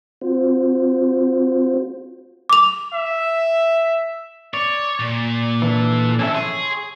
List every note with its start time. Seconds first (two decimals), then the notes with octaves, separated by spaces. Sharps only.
0.21 C4 F4 F#4 C5
2.49 D6 F7
2.93 E5
4.54 C#5 D5
5.00 A#2
5.62 E3 D4 A4
6.19 F2 C#4 E4 A4 E5
6.34 G#4 C#5 C6